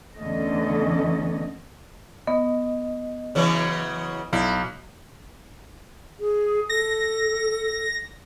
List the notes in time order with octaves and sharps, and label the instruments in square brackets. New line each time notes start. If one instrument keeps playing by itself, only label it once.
[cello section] E2 D3 A3 C#4 A4 D#5
[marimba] B3 [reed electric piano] D#5
[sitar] C#3 E3 F#3
[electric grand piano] B1 [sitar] E4
[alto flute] G#4
[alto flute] A4 [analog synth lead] A#6